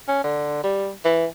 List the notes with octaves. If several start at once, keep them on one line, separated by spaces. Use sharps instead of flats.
C#4
D3
G3
E3